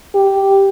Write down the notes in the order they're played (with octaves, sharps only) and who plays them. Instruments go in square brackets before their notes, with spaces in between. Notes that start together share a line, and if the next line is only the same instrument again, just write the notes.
[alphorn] G4